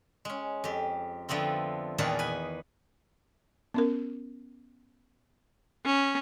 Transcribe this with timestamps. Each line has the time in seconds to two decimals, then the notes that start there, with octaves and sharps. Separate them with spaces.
0.25 G#3 C#4
0.64 F2 G4
1.29 D3 F3 A3 B3 C4
1.98 E2 A#2 D#3 B3 G#4 A5
2.19 B4 G#5
3.74 B3 C#4 A#4
5.86 C#4